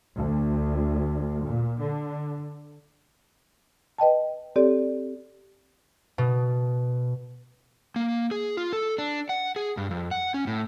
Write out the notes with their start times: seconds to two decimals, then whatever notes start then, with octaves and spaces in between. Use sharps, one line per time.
0.18 D2
1.45 A#2
1.81 D3
3.98 B4 D#5 G5 A5
4.56 C4 G4 A4 C#5 D5
6.18 B2
7.96 A#3
8.31 G#4
8.57 F4
8.73 A4
8.98 D4
9.29 F#5
9.56 G#4
9.77 G2
9.91 F2
10.11 F#5
10.34 C#4
10.47 A2